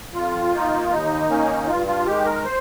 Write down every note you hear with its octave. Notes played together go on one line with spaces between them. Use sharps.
F2 F4
D#3 A#3 D#4
D#2 D#4
D#3 A#3 C#4
G2 F4
F4
D#3 G#3 G4
A#4
C5